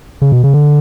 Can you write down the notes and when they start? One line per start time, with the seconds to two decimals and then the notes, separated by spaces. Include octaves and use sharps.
0.22 C#3
0.32 B2
0.44 C#3
0.54 D3